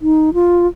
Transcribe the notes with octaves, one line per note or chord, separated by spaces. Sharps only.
D#4
F4